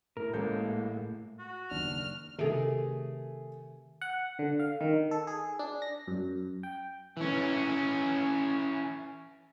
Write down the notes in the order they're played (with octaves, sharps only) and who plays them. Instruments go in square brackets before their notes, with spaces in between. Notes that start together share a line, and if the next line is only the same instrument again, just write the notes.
[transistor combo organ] A2 [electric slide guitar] A#4
[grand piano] A1 A4 G6 [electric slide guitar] G#3 A#3
[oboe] F#4
[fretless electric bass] F#1 D#2 D4 [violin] F6
[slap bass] C3 D#3 [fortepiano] A3 G#4
[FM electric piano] F#5
D3
F5
D#3
A4
G#4
D4
A#6
F#2
G5
[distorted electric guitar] E3 C#4